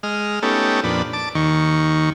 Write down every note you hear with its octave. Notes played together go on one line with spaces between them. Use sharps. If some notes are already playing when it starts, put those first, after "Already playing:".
G#3 D#5 F6
A3 B3 C#4 D#4 G4 A4
F2 A#2 D4 B4
A5 D6
D#2 D#3 C#6